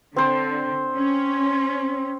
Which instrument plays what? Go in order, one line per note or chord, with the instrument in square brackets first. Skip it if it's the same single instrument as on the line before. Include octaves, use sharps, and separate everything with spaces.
[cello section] D3 [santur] C4 C5
[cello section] C#4